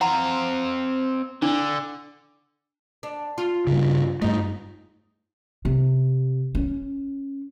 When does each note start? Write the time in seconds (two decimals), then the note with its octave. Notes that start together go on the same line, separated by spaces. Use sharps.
0.01 C4 F5 F#5 A#5 C6
1.42 D3 D4
3.03 D4
3.38 F4
3.67 G2 C#3
4.22 G2 A3 D#4
5.65 C3
6.55 C#4